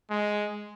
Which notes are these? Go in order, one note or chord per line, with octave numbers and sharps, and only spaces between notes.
G#3